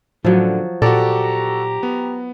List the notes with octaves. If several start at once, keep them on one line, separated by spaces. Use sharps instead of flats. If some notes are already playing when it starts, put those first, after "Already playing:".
F#2 A2 D3 F3 F#3
A#2 F#4 G4 A4 D5 A#5
B3